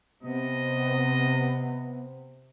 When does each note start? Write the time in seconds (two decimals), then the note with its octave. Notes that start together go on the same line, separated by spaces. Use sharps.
0.23 C3 B3 D#5